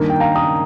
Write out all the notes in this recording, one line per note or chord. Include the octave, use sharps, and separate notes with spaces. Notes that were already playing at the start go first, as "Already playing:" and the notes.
Already playing: G2 D#3 A#3
G5
F5 A#5
A#5 D#6